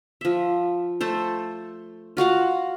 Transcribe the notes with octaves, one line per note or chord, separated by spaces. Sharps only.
F3 E5
A3 A4 C5
F4 F#4 F5 F#5